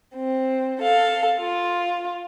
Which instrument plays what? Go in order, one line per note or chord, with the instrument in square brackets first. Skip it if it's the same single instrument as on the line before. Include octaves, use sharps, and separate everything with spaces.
[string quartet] C4
A4 F5
F4